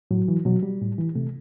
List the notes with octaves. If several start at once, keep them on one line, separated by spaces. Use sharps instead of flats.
A2 F#3
E3
B2 F#3
G3
A2
E3
C3 A3